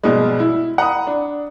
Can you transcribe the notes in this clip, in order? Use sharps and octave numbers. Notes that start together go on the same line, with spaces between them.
A#1 B2 G3 G#3
E4
F#5 A#5 B5 D#6
D4